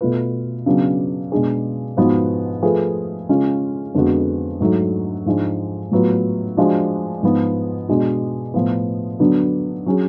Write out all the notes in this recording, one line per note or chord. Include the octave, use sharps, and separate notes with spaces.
B2 A3 F4 B4
C#3 F#3 B3 D4
B2 G#3 D4 G#4
G#2 F3 B3 F#4 B4
F3 A3 F4 G#4 B4
C#3 G#3 C#4 F4
F2 D3 G#3 B3 F#4
G#2 F#3 A3
G#2 F3 G#3 D4
A2 F#3 B3 F4 B4
F3 G#3 D4 F#4
G#2 F3 B3
B2 G#3 D4 F#4
A2 F3 B3
D3 F#3 B3 D4
F#3 C#4 G#4